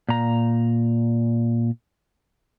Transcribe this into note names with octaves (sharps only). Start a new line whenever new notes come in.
A#2 A#5